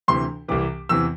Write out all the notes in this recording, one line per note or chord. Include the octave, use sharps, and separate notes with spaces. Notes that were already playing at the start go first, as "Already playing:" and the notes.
D2 C3 E3 C6
C2 C3 E3 D6
E2 C3 E3 E6